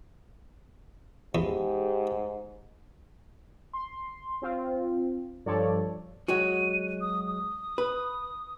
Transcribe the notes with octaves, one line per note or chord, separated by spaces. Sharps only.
E2 G#2 G4 G#4
C6
C4 F4
G2 F3 A4 C#5 D5
F#3 G#3 F#4 D#7
D#6
D#6
B4